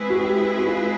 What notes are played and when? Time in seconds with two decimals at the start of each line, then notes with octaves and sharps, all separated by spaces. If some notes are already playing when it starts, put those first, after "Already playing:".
Already playing: G#3 C4 E4 G#4 B4
0.10 F#4
0.24 G4
0.59 F#4
0.67 F4